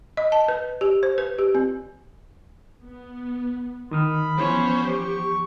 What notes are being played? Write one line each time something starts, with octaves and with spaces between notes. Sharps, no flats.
D#5
A5
B4
G4
C5
B4
G4
C4
B3
D#3 B5 D#6 F6
E3 F3 B3 C#4 C5 C#5
G4 C#6